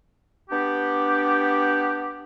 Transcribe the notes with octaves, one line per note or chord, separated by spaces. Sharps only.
B3 D4 G4